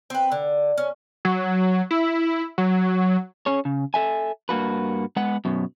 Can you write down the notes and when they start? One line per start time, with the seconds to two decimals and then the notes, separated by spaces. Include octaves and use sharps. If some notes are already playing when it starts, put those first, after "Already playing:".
0.10 C4 B4
0.32 D3
0.78 C#4
1.25 F#3
1.91 E4
2.58 F#3
3.46 C#4 G#4 C#5
3.65 C#3
3.94 A4 E5 G#5
4.49 G2 A#3 F#4 B4
5.16 G#3 B3 F#5
5.45 F#2 B2